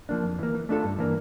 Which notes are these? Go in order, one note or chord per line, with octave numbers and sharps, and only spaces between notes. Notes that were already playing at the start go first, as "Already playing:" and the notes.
F3 A#3 D4
F2
E3 A#3
E3
A3 D4 F4 A4
G2
E3 A#3 D4